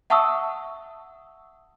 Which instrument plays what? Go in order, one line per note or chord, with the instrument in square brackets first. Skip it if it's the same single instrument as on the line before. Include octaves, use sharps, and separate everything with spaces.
[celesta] E5 F#5 A5 C#6 D#6 E6